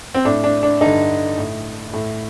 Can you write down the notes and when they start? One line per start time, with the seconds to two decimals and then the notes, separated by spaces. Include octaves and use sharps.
0.14 C4
0.25 A2 D4
0.44 D4
0.63 D4
0.81 G2 D3 D#4
1.38 A2
1.93 A2